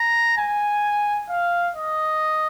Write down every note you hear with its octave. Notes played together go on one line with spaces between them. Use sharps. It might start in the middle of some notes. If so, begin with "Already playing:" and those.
Already playing: A#5
G#5
F5
D#5